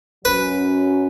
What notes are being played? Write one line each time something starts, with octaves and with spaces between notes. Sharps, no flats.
F#2 F#3 C#4 B4